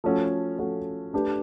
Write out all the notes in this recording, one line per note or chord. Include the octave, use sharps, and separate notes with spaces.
F3 A3 C#4 F#4 A4
F3 A3 C#4 F#4 A4
A3 D4 G4 B4